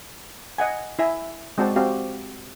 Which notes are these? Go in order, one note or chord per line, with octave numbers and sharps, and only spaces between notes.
D#5 F#5 G#5
E4 E5 G#5
G#3 C4 F#4 C5 D5 A5
C4 F#4 G4 D5 F5